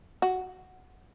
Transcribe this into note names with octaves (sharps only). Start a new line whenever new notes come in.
F#4